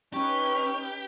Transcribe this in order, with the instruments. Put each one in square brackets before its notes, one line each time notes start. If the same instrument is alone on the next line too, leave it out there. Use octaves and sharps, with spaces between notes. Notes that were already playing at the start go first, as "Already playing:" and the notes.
[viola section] C#4 D#4 B4 [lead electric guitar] G4 [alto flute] C#6